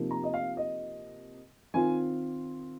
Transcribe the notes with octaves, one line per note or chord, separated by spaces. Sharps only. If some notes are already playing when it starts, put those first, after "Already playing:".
Already playing: C3 F3 A#3 D#4
A#5
D#5
F5
D#5
D#3 C4 F4 G#5